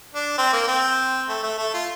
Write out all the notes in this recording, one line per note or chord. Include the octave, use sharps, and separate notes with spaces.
D4
C4
A#3
C4
A3
A3
A3
F4